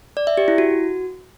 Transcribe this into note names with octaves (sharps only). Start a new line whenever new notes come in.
D5
E5
G4
E4
F#4